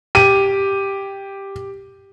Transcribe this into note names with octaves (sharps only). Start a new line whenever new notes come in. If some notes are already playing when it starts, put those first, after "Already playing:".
G4 D#7